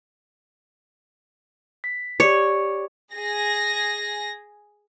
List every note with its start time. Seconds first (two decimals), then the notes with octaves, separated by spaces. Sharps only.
1.84 B6
2.20 G4 C#5 D5 D6
3.13 G#4 A#6